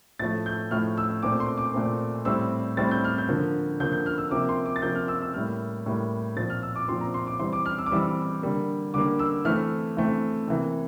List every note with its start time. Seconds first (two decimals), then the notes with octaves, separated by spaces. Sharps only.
0.19 A2 F3 A3 A6
0.46 G6
0.71 A2 F3 A3 F6
0.98 E6
1.23 A#2 A3 C4 D6
1.40 C6
1.58 D6
1.74 A#2 A3 C4
2.25 A2 G3 C4 E6
2.77 A2 G3 C4 A6
2.91 G6
3.04 F6
3.18 G6
3.29 D3 F3 A#3
3.80 D3 F3 A#3 G6
3.92 G6
4.06 F6
4.18 E6
4.31 C3 F3 A#3 D6
4.49 C6
4.66 D6
4.76 A6
4.82 C3 F3 A#3 G6
4.95 F6
5.08 E6
5.22 E6
5.34 A2 G3 A#3 F6
5.86 A2 G3 A#3
6.36 A#2 F3 C4 A6
6.50 F6
6.62 E6
6.76 D6
6.88 A#2 F3 C4 C6
7.01 A#5
7.14 C6
7.27 D6
7.39 E3 G3 C4 C6
7.53 D6
7.66 F6
7.78 E6
7.86 D6
7.91 E3 G3 C4 E6
8.42 D3 G3 A#3
8.94 D3 G3 A#3 D6
9.19 E6
9.45 E3 A3 C4 F6
9.97 E3 A3 C4
10.48 C3 E3 A#3